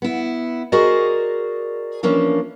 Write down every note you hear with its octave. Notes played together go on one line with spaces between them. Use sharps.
B3 E4
F#4 G#4 A#4 C5 D5 D#5
E3 F3 A#3 C#4 D4